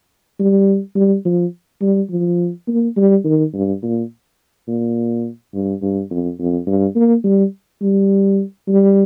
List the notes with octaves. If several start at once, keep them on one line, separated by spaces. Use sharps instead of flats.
G3
G3
F3
G3
F3
A#3
G3
D#3
G2
A#2
A#2
G2
G2
F2
F2
G2
A#3
G3
G3
G3